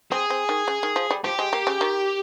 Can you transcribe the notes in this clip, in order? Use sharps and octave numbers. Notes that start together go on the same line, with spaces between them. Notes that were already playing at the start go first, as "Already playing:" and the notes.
C4 G#4
C4
D#3
C#3
D#3
F3
G3
F3 G4
G#3
A#3
C#3
D#3